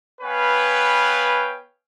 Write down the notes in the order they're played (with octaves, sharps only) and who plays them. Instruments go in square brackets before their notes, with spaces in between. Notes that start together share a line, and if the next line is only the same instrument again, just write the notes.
[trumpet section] B3 B4 C#5 F5 G5 G#5